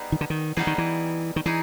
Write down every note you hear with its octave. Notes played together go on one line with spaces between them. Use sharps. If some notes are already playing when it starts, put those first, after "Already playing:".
Already playing: G3 B3 D#4 G#4
D#3
D3
D#3
E3 G3 B3 D#4 G#4
D#3
E3
D#3
E3 D#4 G#4